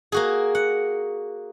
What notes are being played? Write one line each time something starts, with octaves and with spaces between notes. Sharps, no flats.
A#3 F#4 G#4
F#5